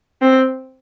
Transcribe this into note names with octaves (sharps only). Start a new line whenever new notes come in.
C4